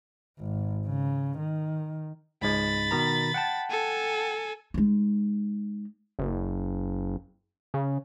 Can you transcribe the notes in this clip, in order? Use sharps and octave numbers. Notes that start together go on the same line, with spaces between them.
G#1
C#3
D#3
C#2 G#2 G#3 B5 A6
B2 D#3 A#5
F#5 G5 A5
A4 G#5
G#3 D#4
F#1
C#3